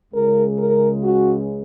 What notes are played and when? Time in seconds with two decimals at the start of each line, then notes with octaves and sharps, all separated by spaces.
0.13 C#2 C#3 G#3 A#4
0.58 A#4
1.03 F#4